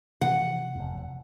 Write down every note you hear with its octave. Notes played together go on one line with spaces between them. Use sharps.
C3 E3 F3 F#5
F1 E2